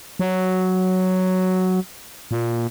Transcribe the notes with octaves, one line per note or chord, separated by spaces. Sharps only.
F#3
A#2